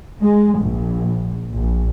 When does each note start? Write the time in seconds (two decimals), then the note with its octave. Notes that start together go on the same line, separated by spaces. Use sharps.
0.22 G#3
0.60 A#1
1.53 A#1